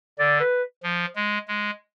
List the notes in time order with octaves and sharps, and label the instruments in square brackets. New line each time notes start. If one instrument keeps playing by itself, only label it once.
[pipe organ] D3 [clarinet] D5
[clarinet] B4
[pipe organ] F3
G#3
G#3